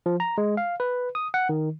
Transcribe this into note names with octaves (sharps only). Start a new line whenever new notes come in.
F3
A#5
G#3
F5
B4
D#6
F#5
D#3